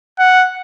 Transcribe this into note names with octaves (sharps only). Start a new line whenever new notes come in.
F#5